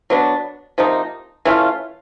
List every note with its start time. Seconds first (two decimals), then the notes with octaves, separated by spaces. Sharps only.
0.10 F#3 B3 D4
0.78 C3 F3 A#3 D#4
1.45 E3 A3 C#4 F4